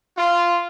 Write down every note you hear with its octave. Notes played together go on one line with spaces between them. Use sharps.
F4